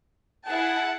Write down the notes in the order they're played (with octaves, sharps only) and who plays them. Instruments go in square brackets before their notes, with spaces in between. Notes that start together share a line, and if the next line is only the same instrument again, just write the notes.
[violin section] E4 G#4 A5 [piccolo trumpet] F#5